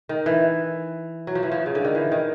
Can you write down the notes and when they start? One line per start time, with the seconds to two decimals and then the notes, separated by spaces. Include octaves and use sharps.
0.09 D#3
0.26 E3
1.27 F#3
1.35 F3
1.43 E3
1.52 F3
1.66 C#3
1.75 D3
1.85 D#3
1.95 E3
2.11 D#3